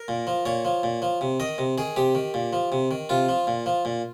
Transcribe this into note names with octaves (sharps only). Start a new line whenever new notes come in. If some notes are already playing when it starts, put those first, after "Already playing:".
Already playing: A#4
A#2
F3
A#2 C#5
F3
A#2
F3
C3
D#3 D#5
C3
D#3 G#4
C3 G4
D#3
A#2
F3
C3
D#3
C3 F4
F3
A#2
F3
A#2